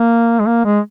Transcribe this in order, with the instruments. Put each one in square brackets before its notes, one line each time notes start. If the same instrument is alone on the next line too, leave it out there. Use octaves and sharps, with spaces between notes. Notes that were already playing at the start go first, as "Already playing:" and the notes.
Already playing: [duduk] A#3
G#3
A#3
G#3